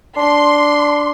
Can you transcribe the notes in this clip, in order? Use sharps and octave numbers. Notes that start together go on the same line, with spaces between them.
D4 C6